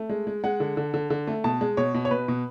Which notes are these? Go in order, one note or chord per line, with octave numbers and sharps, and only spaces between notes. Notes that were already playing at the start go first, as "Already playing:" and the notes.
Already playing: A3
G#3
G#3
G#3 F#5
D3
D3
D3
D3
A3
B2 A5
G#3
B2 C#5
B2
C#5
B2 B4
B2